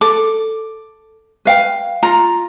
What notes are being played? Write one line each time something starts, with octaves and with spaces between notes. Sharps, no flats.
A4 D6
B4 F5 G5
F4 A#5